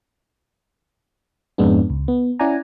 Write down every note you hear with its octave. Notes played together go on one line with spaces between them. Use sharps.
F2 G#2 G#3 B3 D4
C#2
B3
C#4 E4 D5 F#5 G#5 A#5